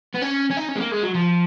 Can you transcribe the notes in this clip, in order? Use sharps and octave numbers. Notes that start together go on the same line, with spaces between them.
B3
C#4
C#4
D#4
C#4
G#3
A#3
G#3
F#3
F3